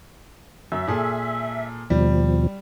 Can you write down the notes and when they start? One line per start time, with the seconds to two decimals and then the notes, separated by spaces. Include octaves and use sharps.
0.72 F#2 E5
0.87 A#2 G#4 A4
1.90 D#2 B2 F3 G3